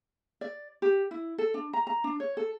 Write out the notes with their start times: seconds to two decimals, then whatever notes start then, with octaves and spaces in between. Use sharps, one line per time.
0.41 D5
0.82 G4
1.11 E4
1.38 A4
1.54 D4
1.73 A#5
1.87 A#5
2.04 D4
2.20 C#5
2.37 A4